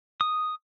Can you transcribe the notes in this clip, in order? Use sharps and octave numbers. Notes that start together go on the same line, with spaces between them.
D#6